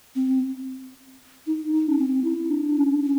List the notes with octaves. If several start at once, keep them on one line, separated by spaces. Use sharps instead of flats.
C4
D#4
D#4
C#4
C4
E4
D4
C#4
D4
C#4